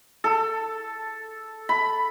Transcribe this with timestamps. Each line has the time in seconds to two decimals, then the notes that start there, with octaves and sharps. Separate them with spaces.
0.24 A4
1.69 B5